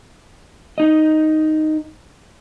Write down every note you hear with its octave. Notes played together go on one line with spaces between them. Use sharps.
D#4 D#5